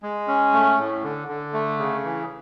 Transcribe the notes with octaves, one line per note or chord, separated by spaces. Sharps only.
G#3
C#4
A3
A2
D3
D3
A3
C#3
E3